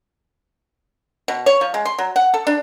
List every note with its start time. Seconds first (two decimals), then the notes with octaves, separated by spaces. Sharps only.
1.28 B2
1.46 C#5
1.61 F3
1.74 G#3
1.85 C6
1.99 F#3
2.16 F#5
2.34 A4
2.47 D4